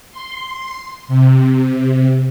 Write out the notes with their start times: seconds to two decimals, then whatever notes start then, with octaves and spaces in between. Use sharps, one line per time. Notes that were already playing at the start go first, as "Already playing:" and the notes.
0.12 C6
1.08 C3